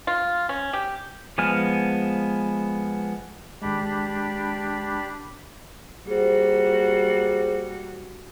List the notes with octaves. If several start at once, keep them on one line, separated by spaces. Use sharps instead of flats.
F4
C#4
G4
F3 G#3 B3 G#5 F6
G#1 G#3 D4 G4 B5
G3 A#3 F#4 G#4 C5